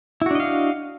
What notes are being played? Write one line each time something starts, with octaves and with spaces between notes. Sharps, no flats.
D4 E4 F#4 D#5 F5